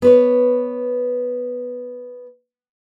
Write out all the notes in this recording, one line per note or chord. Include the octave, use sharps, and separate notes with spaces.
B3 B4 C#5